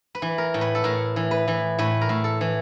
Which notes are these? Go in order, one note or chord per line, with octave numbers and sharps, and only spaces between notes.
B4
E3
A#4
A2
B4
A4
A2 A#4
E3
B4
E3
A2 B4
A#4
A2
A4
E3